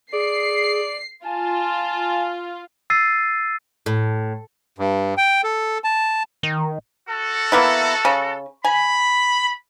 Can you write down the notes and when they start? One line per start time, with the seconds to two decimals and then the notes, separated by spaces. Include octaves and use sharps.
0.13 G#4 D5 C7
1.25 F4 G#5 A5
2.90 E6 A6 C7 D#7
3.86 A2
4.79 G2
5.18 G5
5.44 A4
5.84 A5
6.43 D#3
7.08 F#4 A4
7.52 A#3 B3 E4
8.05 C#3
8.65 G#5 B5